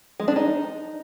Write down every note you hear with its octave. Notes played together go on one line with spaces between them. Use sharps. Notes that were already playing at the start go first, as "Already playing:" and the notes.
G#3
D4
D#4